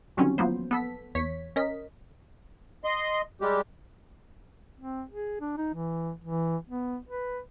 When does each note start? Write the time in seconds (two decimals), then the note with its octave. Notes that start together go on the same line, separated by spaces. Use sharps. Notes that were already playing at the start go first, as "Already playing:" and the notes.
0.17 D3 D#3 F#3 G3 C4 C#4
0.38 F3 F#3 A#3 B3 C5
0.71 B3 A4 B6
1.15 E2 C#5 B6
1.56 C#4 A#4 D#5 B6
2.84 D#5 C6
3.41 G3 G#3 G4
4.80 C4
5.10 G#4
5.41 D4
5.57 D#4
5.74 E3
6.24 E3
6.69 B3
7.09 B4